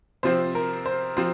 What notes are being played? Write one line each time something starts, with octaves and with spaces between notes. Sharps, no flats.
C3 F3 C4 C5
A#4
C5
F3 C4 C5